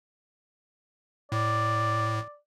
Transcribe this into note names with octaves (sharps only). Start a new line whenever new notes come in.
A2 D5